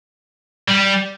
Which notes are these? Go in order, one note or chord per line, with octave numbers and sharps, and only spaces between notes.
G3